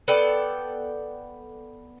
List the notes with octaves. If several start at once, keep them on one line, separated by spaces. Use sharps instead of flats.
B3 A4 D5 G5